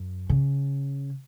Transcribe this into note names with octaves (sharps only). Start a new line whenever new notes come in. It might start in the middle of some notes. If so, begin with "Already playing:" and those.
Already playing: F#2
C#3